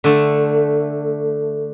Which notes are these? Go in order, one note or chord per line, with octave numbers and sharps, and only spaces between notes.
D3 A3